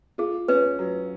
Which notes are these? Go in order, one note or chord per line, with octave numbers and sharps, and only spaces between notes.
F4 G#4
C#4 B4
F#3